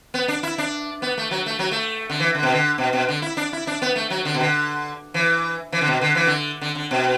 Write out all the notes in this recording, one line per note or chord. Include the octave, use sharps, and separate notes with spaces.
B3
D4
E4
D4
B3
A3
F#3
A3
F#3
A3
D3
E3
D3
B2
D3
B2
B2
D3
E4
D4
E4
D4
B3
A3
F#3
D3
B2
D3
E3
E3
D3
B2
D3
E3
D3
D3
D3
B2